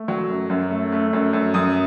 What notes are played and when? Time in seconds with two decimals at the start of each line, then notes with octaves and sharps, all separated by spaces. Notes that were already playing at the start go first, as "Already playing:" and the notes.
Already playing: A3
0.08 F#3
0.30 F#2
0.50 F#2
0.71 A3
0.92 A3
1.13 F#2
1.33 F#2
1.54 F#2 D#6